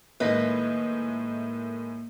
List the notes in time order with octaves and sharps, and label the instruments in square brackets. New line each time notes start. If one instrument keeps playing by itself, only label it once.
[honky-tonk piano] A2 D#3 G#3 [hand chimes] A#3 [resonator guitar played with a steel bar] B4 D#5